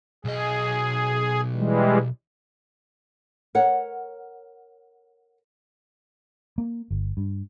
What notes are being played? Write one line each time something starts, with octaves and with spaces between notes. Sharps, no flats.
B1 G#4 D#5
E3 G3 G#3
A#4 C#5 F#5
A#3
G1
G2